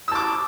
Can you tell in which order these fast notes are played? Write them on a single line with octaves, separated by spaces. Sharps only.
E6 A5 D6